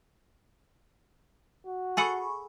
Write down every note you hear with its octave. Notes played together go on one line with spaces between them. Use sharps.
F#4
G#4 A4 F#5 G#5 B5 C#6